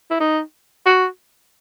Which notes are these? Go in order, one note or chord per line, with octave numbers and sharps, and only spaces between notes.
E4
D#4
F#4